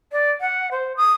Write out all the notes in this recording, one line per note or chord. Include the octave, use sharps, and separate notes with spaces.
D5
F#5
C5
D#6